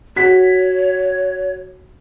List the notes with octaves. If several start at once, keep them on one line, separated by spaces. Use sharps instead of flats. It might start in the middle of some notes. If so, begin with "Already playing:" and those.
F#4 C#5 B6